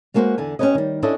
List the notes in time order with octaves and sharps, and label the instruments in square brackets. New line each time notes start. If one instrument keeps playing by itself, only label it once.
[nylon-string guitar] G#3 A#3 F#4 A4 B4 C5
E2 D3 G#5
C#4 E4 G4 B4 C#5 D#5
D#3 G3
C#4 D4 E4 A4 D#5